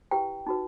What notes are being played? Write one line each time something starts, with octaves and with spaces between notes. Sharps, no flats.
E4 G4 B4 G5
D#4 F#4 B4